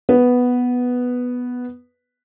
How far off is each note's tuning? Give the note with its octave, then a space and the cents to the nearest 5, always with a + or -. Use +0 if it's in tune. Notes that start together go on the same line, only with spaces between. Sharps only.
B3 +0 B4 +0